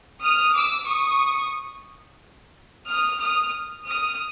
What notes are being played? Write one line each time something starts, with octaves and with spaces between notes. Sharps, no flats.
D#6 F6
D6 E6
C#6 D#6
D#6 F6
D#6 F6
D#6 F6